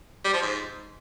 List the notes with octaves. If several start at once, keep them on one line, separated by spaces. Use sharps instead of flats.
G3
F3
G#2